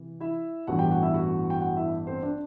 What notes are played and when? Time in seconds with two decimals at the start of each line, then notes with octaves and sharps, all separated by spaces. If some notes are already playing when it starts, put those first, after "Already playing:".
Already playing: C3 E3
0.20 E4 E5
0.67 A1 G2 E3 B3 F#4 F#5
0.79 G4 G5
0.91 F#4 F#5
1.03 E4 E5
1.14 F#4 F#5
1.50 G5
1.61 F#4 F#5
1.76 E4 E5
2.07 C4 C5
2.23 D4 D5